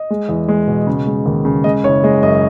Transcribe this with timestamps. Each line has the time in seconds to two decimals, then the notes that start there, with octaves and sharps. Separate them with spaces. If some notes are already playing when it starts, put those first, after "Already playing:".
Already playing: D#5
0.10 G#3
0.29 E2
0.48 G#3
0.67 B2
0.87 C#3
1.07 G#3
1.26 D#2
1.45 C#3
1.64 G#3 D#5
1.84 F#1 C#5
2.04 G#3 D#5
2.22 F#2 D#5